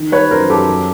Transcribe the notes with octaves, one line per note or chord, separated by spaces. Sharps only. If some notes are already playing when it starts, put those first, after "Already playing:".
Already playing: D#3
G3 B4 C#5
F#2 A#4 C5
F#2 G4 A4
F#3